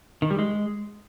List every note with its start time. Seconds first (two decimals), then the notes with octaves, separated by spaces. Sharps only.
0.22 D#3
0.30 G3
0.39 G#3